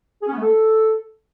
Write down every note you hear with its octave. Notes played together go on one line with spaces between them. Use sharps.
G#4
C#4
B3
A3
A4